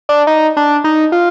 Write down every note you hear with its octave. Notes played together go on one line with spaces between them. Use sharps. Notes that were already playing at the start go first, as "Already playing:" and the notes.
D4
D#4
D4
D#4
F4